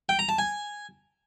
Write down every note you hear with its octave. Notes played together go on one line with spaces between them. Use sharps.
G5
A#5
A5
G#5